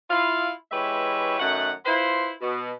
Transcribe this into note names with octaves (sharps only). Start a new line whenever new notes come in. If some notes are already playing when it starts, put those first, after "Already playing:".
E4 F4 F5
E3 G#3 G4 B4 C#5 E5
F#2 D#3 A3 F#5
E4 F4 B4 C5
B2